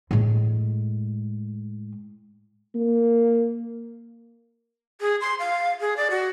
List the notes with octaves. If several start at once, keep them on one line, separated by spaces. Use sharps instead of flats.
A2 G#3
A#3
G#4
C6
F5
G#4
D5
F#4